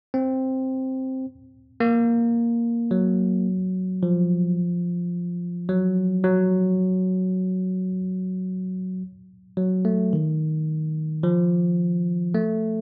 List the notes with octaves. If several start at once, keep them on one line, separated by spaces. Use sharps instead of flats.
C4
A#3
F#3
F3
F#3
F#3
F#3
A3
D#3
F3
A3